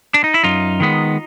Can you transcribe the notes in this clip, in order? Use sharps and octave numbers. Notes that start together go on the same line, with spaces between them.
D4
D#4
E4
F#2 D#4 F4
D#3 G#3 B3